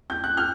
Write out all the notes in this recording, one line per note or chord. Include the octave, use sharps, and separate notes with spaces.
G6
F#6
F6 G6